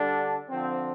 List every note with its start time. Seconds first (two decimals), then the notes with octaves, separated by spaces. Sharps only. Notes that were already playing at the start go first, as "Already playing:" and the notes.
Already playing: D3 G3 D4 A4
0.49 D3 F3 C4